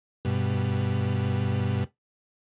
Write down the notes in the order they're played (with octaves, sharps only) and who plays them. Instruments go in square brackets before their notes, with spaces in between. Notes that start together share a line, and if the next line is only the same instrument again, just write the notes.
[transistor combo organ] G2 B2